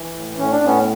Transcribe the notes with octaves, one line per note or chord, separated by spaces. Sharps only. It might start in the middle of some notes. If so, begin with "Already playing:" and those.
Already playing: E3
A2
A2 C#4
D4
A2 B3 C#4